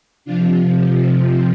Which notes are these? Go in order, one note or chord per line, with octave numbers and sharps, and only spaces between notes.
C3 F3 D4 F4